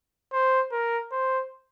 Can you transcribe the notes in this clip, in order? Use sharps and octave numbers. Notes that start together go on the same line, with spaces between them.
C5
A#4
C5